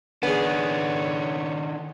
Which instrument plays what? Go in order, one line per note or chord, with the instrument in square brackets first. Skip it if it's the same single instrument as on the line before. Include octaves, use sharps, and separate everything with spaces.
[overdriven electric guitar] D#3 D4 [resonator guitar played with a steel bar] B3 [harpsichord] C#4 G#4 [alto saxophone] C#5